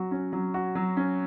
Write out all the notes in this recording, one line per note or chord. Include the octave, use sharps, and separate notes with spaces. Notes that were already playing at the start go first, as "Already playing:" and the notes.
Already playing: F#3 F#4
C#4
F#3
F#4
F#3
C#4